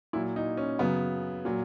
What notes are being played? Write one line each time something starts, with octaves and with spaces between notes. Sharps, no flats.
A#2 F#3 E4
D#4
C#4
F#2 C#3 F#3 B3
A#2 F#3